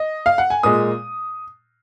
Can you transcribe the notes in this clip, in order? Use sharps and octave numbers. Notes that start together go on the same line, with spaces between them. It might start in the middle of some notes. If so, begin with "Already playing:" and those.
Already playing: D#5
F5
F#5
G#5
A#2 G#3 D#6